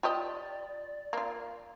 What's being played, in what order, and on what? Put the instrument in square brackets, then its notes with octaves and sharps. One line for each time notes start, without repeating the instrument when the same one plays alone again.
[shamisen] F4 G4 D#5 [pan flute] D5
[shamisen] A#3 F4